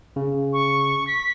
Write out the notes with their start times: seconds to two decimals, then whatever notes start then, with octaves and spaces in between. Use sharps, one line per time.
0.16 C#3
0.53 C#6
1.07 B6